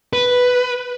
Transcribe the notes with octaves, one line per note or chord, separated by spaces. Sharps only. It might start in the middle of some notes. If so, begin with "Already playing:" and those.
B4